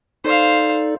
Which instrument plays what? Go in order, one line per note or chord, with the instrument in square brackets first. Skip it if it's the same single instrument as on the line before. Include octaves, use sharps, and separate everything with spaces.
[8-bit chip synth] D#4 A4 D5 [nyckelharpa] C5 F5